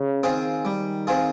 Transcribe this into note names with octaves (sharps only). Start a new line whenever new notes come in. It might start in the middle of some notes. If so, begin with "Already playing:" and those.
Already playing: C#3
D#3 C4 F4 G#4
G3
C4 F4 G#4